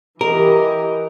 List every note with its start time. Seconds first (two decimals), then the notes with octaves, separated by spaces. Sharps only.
0.21 E3 G4 A#4 D#5